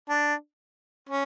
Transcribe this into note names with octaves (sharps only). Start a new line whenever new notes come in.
D4
C#4